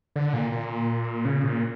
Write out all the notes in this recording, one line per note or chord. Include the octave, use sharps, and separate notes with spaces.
D3
A#2
A#2
C#3
A#2